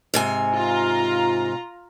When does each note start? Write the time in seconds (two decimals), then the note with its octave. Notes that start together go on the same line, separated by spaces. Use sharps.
0.14 G#2 C3 G#5
0.55 F4 A#5